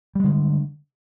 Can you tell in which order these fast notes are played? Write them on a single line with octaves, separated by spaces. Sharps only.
G3 G#3 D3